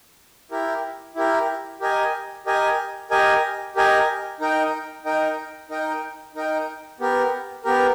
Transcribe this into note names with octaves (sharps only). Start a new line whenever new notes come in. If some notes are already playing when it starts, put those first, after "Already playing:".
E4 G4 A#4
E4 G4 A#4
G4 A#4 D#5 G#5
G4 A#4 D#5 G#5
G4 A#4 D#5 G#5
G4 A#4 D#5 G#5
D#4 A#4 D#5 G5
D#4 A#4 D#5 G5
D#4 A#4 D#5 G5
D#4 A#4 D#5 G5
B3 G4 A#4
B3 G4 A#4